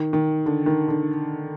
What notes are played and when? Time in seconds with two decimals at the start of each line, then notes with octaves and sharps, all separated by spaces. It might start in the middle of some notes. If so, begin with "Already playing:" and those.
Already playing: D#3
0.13 D#3
0.46 D3
0.66 D#3
0.88 D3